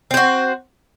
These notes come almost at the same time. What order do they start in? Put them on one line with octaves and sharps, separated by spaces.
C4 C5 F#4